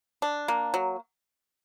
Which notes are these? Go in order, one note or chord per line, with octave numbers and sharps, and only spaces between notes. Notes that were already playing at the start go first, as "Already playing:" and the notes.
D4
A#3
F#3